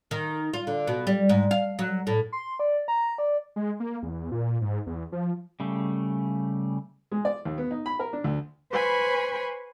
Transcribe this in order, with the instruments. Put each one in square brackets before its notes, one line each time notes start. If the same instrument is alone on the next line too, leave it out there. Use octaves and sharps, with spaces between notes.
[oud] D#3
F4
D3
B2
G3
G#2
F5
F#3
A2
[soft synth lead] C6
D5
A#5
D5
[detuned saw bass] G#3
A#3
E2
A#2
G#2
E2
F3
[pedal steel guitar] C#3 G3 A3
[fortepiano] G#3
D5
D#2
B3
D#4
B5
A#4
D4
D2
[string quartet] B4 C5 G#5 B5 C#6